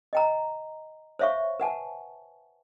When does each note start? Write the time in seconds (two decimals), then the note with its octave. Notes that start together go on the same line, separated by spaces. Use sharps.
0.13 D#5 G5 A#5
1.19 C5 C#5 E5 F5 C#6
1.60 B4 F#5 G#5 A5